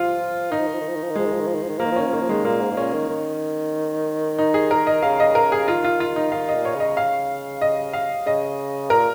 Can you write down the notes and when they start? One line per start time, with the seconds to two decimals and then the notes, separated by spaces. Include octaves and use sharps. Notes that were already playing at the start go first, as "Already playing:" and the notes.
Already playing: F3 F4
0.50 D#3 D#4
0.59 F3
0.66 D#3
0.74 F3
0.80 D#3
0.88 F3
0.95 D#3
1.03 F3
1.10 D#3
1.15 F3 G#3
1.25 D#3
1.32 F3
1.40 D#3
1.47 F3
1.54 D#3
1.63 F3
1.69 D#3
1.78 F3 A#3
1.85 D#3
1.92 F3
1.96 D#3 C#4
2.07 F3
2.13 D#3 A#3
2.21 F3
2.29 D#3 G#3
2.45 A#2 A#3
2.60 G#2
2.71 G#2
2.77 A#2 C#4
2.93 D#3
3.09 D#3
4.38 D#4
4.54 G#4
4.71 A#4
4.87 D#5
5.03 C#3 F5
5.20 D#5
5.35 A#4
5.52 G#4
5.68 D#3 F4
5.84 F4
6.00 F4
6.16 D#4
6.32 D#3 F5
6.49 D#5
6.54 A#2
6.65 C#5
6.75 C#3 D#5
6.97 F5
7.61 D#5
7.93 F5
8.26 C#3 D#5
8.90 A#2 A#4